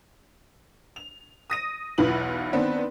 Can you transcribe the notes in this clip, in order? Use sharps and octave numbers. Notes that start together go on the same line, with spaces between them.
F7
D#6 A#6 D#7
B1 E2 E3 F4 B4 F#7
D#3 B3 C4 D4 B4